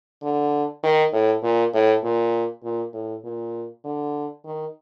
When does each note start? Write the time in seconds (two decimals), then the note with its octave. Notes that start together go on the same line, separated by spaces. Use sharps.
0.23 D3
0.83 D#3
1.13 A2
1.43 A#2
1.74 A2
2.03 A#2
2.63 A#2
2.93 A2
3.24 A#2
3.84 D3
4.45 D#3